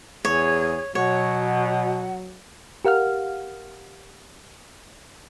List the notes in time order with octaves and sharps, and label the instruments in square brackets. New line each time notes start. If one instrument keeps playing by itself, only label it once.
[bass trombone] E2 [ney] G#4 [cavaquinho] C#5
[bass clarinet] B2 [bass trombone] F#3 [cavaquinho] C#5 [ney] F#5
[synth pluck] G4 A#4 F5 F#5 F6